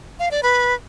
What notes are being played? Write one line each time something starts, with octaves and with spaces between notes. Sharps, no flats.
F5
D5
B4